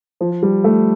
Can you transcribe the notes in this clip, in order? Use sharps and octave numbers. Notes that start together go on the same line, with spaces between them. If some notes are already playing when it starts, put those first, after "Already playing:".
F3
G3
A3